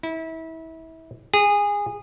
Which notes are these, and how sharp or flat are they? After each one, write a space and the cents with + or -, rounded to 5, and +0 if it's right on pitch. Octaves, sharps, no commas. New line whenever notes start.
E4 -30
G#4 -20